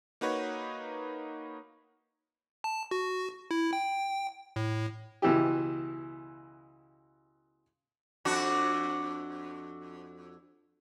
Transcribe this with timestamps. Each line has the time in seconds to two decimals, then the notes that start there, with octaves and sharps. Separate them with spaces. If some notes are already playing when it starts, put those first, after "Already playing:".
0.21 A#3 D#4 F#4 B4 C#5
2.64 A5
2.91 F#4
3.51 E4
3.73 G5
4.56 A2
5.22 C#2 B2 E3 E4 G4
8.25 F2 D4 F#4